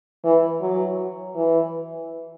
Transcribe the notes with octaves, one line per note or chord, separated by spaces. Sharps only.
E3
F#3
E3